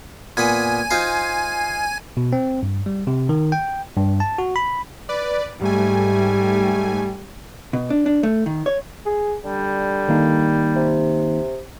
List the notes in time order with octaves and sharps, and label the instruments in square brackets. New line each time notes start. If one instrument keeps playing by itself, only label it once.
[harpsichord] A#2 B3 B5 [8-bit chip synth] G#5
[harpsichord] D#4 F4 C5
[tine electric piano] B2
C4
G2
G3
C3
D#3
G5
G2
A5
F#4
B5
[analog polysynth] B4 D5
[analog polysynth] G#2 A3 G#5 [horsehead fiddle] G3
[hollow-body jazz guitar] B2
D4
D4
A3
D#3
C#5
[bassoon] G#4
[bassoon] D3 [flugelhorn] G3
[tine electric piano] D#3 A#3 D#4
[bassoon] C3